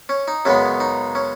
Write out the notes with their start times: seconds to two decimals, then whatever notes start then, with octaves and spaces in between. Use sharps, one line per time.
0.09 C#4
0.28 D#4
0.45 F#2 C#3 G#3 B3 C#4
0.80 D#4
1.15 C#4